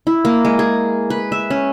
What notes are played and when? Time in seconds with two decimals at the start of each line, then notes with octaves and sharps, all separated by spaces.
0.07 E4
0.25 A#3
0.45 G#3
0.59 G#4
1.10 B4
1.32 E5
1.50 C#4